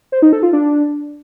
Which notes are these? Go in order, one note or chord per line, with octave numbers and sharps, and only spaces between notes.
C5
D#4
A4
F4
D4